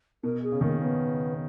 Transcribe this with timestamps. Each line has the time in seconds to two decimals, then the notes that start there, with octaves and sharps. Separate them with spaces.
0.23 B2 A#4
0.43 G#4
0.52 C#3
0.61 D#3 A#3
0.68 C#3
0.81 C#3 B3